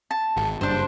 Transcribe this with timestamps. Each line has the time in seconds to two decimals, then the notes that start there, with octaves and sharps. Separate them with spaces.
0.11 A5
0.37 G#1
0.61 F#1 G2 D4 C5